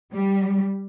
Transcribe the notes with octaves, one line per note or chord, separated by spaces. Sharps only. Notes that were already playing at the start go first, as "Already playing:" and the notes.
G3